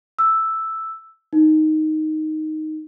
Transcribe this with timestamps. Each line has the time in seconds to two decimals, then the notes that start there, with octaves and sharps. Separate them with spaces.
0.19 E6
1.33 D#4